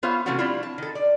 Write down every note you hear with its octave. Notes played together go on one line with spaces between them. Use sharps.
B3 F4 C5 C#5 E5 F5
C3 E3 F3 A3 C#4 F#4
G3 C4 D4 E4 F4
A5
D#3 A4
D5